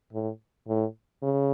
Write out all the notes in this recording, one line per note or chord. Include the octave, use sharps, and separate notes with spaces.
A2
A2
C#3